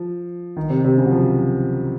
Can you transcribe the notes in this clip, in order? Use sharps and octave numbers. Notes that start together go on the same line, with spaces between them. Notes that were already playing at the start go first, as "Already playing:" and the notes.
Already playing: F3
D#3
C3
C3
C#3
F#3
F3